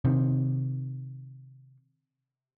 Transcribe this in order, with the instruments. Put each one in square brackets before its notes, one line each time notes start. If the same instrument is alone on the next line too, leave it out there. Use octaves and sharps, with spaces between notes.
[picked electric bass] C3 D#3